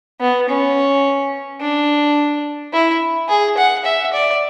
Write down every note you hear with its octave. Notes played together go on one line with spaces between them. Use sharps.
B3
C#4
D4
E4
G#4
F#5
E5
D5